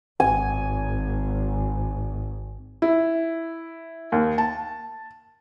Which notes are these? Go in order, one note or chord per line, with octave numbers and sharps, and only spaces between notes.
G#1 G#5
E4
D#2
A5